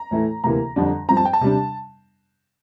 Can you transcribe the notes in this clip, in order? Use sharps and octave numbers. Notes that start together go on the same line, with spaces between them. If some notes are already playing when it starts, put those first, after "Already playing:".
Already playing: A#5
A2 E3 A3
D2 C3 E3 A#3 A#5
F2 D3 G3 D4
G2 F3 C4 A#5
A5
G5
A5
C3 G3 D4